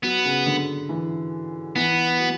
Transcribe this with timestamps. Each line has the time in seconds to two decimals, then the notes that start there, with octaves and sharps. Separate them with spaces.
0.03 F#3 B3
0.25 C#3
0.46 D3
0.89 E3
1.76 E3 B3
2.20 F#3